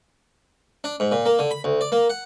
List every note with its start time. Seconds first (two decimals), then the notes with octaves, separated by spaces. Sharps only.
0.84 D4
1.00 G#2
1.12 A#2
1.26 A#3
1.39 D3
1.51 B5
1.64 D2
1.81 D5
1.92 A#3
2.10 F#5